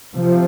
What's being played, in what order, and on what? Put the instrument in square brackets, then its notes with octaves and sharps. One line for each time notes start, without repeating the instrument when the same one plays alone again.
[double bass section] C3 F3